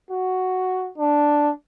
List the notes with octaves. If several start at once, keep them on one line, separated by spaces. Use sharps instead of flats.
F#4
D4